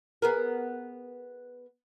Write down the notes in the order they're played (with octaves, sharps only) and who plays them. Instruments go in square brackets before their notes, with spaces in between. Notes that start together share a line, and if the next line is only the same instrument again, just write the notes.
[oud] B3 G#4 A#4